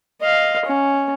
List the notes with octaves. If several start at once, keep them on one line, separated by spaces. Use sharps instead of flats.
D#5 F5
C#4